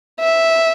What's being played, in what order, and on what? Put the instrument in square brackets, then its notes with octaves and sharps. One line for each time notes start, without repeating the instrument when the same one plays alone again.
[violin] E5